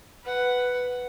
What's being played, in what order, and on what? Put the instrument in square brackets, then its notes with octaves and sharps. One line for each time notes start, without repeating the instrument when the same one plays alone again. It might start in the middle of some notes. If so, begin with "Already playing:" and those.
[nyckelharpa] B4 F#5